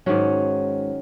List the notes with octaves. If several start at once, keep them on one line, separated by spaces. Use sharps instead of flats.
G#2 D#3 F#3 C#4